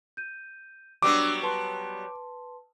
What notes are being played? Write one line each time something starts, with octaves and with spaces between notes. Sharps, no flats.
G6 D#7
F#3 G3 B3 D4 D6 E6 D#7
B4 A5 C6